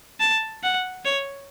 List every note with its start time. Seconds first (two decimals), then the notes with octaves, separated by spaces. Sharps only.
0.20 A5
0.63 F#5
1.05 C#5